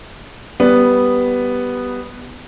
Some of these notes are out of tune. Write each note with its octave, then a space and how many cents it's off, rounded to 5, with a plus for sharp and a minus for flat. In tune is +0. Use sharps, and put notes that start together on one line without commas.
G3 +0 B3 +0 D5 +0